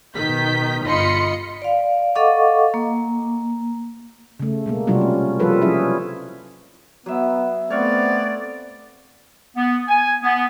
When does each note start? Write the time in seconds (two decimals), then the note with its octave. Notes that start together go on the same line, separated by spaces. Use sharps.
0.15 B2 D#3 G6 B6
0.86 G1 F4 D#5 B5 C6 C#7
1.62 D5 F5
2.15 A4 D#5 F5 F#5 C#6 D6
2.74 A#3
4.40 C#3 A3
4.66 B2 G#3 A#3
4.87 C3 F#3 G3 D4 F4 F#4
5.01 C#4
5.40 F3 G3 F4 A4 B4
5.61 F3 F#3 C#4 E4 G#4 E5
7.06 F#3 B3 E5
7.70 A3 B3 C4 C#5 D5 F5 F#5
9.56 B3
9.88 G#5
10.23 B3